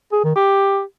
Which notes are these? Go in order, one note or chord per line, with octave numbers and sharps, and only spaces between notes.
G#4
D#3
G4